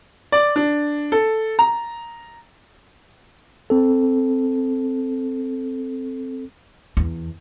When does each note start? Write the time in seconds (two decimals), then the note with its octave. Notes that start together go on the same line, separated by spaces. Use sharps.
0.32 D5
0.56 D4
1.12 A4
1.59 A#5
3.70 C4 A4
6.97 E2